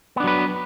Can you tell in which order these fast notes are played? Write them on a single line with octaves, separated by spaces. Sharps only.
B3 D4 F#3 B4